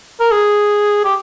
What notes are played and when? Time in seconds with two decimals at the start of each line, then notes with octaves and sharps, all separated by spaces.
0.20 A#4
0.31 G#4
1.04 G4